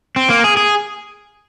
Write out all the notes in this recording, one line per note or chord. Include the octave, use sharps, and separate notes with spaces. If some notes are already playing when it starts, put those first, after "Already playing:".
C4
A#3
G#4
G#4